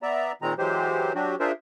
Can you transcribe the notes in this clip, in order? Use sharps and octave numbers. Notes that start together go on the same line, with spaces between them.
B3 D5 E5 A#5
A#2 D#3 G#3 C4 A#5
E3 F#3 G#3 G4 C5
F#3 D4 F#4 G4
D4 F4 G#4 A#4 C5 E5